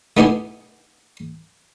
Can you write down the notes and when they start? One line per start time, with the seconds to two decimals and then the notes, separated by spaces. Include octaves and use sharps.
0.17 A3 B3 D#4 E4 G4 G#5